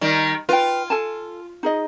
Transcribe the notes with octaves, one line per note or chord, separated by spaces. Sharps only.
D#3 G3
F4 B4 G5
A4 G#5 A5
D#4 G#4 D#5